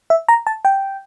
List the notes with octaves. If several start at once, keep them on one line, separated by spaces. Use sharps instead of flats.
E5
A#5
A5
G5